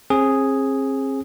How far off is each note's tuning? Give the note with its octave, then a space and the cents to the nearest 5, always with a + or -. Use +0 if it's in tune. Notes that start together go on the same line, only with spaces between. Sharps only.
C4 +40 G#4 +0